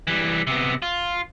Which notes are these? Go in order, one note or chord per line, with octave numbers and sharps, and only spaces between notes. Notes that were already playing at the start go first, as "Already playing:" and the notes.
E3 G3
C3 B3
F4